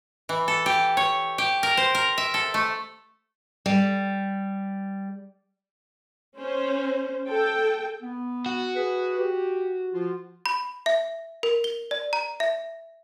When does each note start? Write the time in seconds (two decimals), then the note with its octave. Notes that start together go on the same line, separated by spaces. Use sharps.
0.29 E3
0.48 A4
0.66 G4
0.97 C#5
1.38 G4
1.63 A#4
1.77 C5
1.95 A#4
2.18 E5
2.34 A4
2.54 A3
3.66 G3
6.39 C#4 C5
7.28 A4 G5
8.02 B3
8.46 F#4
8.76 G#4 B4
9.18 G4
9.94 F3 F4
10.46 B5
10.86 E5
11.43 A#4
11.64 G7
11.91 D5
12.13 A#5
12.40 E5